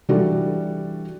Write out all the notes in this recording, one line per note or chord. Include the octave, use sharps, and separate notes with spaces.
E3 G3 D4 F#4 A4 D5